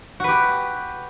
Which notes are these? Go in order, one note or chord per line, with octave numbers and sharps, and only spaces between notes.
F#4 G4 B4